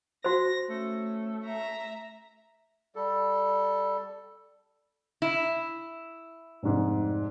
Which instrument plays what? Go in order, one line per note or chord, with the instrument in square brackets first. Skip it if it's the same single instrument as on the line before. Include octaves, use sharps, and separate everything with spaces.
[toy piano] F#4 C5 [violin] A#6
[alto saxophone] A3 [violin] C#4
[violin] E5 A#5
[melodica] G3 A4
[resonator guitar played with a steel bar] E4
[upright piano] F1 G#2